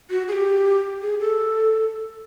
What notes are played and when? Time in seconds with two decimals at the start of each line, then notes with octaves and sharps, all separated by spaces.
0.10 F#4
0.28 G#4
0.33 G4
1.02 G#4
1.20 A4